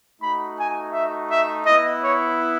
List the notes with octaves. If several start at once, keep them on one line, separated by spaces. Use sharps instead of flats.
A3 D#4 F#4 B5
G#5
E5
E5
B3 E4 D#5
C#5